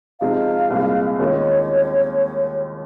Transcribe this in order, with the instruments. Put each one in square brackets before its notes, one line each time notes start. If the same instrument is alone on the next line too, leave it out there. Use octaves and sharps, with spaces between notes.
[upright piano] C3 F3 G#3 D#4 [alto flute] F5
[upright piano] C2 A#2 G#3 C4
[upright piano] D#2 D#3 G#3 C#4 F4 [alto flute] C#5